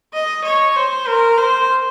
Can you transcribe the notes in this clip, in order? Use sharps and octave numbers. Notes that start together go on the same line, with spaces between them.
D#5
C#5
C5
A#4
C5